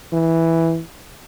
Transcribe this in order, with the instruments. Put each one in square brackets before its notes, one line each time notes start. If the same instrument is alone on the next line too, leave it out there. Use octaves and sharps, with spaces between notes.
[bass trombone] E3